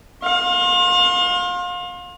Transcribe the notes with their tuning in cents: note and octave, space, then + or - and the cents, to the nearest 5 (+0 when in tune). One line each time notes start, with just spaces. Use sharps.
F5 +35 C6 +35